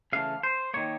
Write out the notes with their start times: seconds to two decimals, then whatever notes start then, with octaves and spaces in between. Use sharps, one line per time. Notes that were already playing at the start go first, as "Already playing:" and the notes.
0.13 C#3 E3 A3 F5
0.43 C5
0.74 D#3 F#3 A#3 C#5